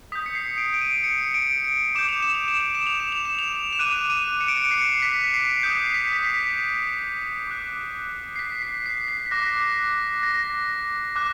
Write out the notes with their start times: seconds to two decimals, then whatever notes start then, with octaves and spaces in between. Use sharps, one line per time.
0.12 D#6 G6 B6
0.26 C#7
0.35 C7
0.58 D7
0.74 D7
0.81 D#7
1.04 C#7
1.34 D7
1.64 D7
1.95 D6 G6 E7
2.08 F7
2.22 E7
2.35 F7
2.48 E7
2.60 F7
2.74 E7
2.87 F7
3.00 E7
3.12 F7
3.25 E7
3.39 F7
3.53 E7
3.73 E7
3.79 D6 F#6 D#7
4.10 D#7
4.41 C#7
4.48 D7
4.57 C#7
4.71 C7
5.02 B6
5.34 C7
5.63 D#6 G6 C7
5.94 B6
6.04 C7
6.13 B6
6.24 B6
7.47 D6 F#6
8.36 C7
8.39 B6
8.63 C7
8.86 C7
9.08 B6
9.26 B6
9.31 D6 F#6 A#6
10.23 A#6
11.16 D6 F#6